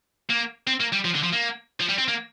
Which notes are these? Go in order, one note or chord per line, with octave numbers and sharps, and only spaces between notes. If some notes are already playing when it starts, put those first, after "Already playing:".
A#3
C4
A#3
G3
F3
D3
F3
A#3
F3
G3
C4
A#3